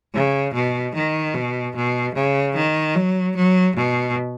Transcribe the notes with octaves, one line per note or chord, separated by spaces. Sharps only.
C#3
B2
D#3
B2
B2
C#3
D#3
F#3
F#3
B2